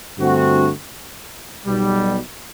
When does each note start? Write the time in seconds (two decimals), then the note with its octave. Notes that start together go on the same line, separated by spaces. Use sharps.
0.18 G2 D3 A3 C4 F#4
1.66 B1 B2 G3